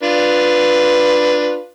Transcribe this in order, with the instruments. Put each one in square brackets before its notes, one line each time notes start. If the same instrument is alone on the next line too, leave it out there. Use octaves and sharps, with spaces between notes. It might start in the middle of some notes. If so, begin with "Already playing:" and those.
[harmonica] D4 F4 B4